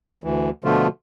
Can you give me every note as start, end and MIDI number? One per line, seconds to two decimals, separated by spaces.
0.24 0.50 38
0.24 0.50 52
0.64 0.88 47
0.64 0.88 50
0.64 0.88 53
0.64 0.88 57
0.64 0.88 65